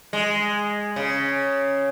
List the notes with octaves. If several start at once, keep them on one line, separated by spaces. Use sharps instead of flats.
G#3
C#3